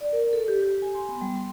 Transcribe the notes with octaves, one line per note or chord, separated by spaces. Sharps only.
D5
A#4
A4
G4
G4
G#5
C6
B3
G3
C6